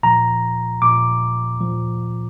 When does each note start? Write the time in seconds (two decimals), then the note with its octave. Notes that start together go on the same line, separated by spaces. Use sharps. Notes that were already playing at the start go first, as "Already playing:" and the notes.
0.03 A#2 F3 A#5
0.82 A#2 F3 D6
1.61 A#2 F3